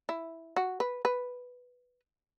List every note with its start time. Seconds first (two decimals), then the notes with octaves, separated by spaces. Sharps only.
0.09 E4
0.56 F#4
0.80 B4
1.05 B4